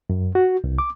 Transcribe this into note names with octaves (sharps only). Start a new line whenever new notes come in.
F#2
F#4
C2
D6